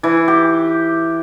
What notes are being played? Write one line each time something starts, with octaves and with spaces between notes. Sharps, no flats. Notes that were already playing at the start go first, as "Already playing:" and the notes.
E3
G4